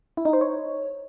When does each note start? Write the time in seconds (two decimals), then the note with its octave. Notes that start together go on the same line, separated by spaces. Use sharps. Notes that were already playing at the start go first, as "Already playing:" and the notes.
0.17 E4
0.25 D#4
0.33 C5
0.41 C#5